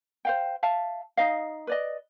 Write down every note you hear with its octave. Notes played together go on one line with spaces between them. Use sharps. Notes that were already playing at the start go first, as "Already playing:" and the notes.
C5 F5 G5
E5 F5 A5
D#4 D#5 F5
B4 D5 D#5